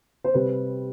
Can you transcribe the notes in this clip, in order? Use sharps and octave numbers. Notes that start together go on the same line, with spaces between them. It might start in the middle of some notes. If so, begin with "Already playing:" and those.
C5
C3 G3 C4 B4